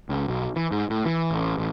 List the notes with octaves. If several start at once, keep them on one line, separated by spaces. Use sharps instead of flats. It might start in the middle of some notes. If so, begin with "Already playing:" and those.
C#2
B1
E3
G#2
A2
E3
A1
A1